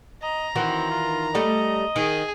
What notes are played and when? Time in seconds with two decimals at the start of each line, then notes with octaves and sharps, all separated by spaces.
0.22 D#5 A#5
0.55 D#3 E3 C4 F#4
0.91 F4
1.35 G3 A3 D#5
1.96 D#3 G#4